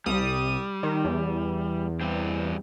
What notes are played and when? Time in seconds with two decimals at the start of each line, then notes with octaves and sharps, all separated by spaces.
0.06 C2 G3 D#6
0.83 D#3
1.05 E2
2.01 G2 G3 C4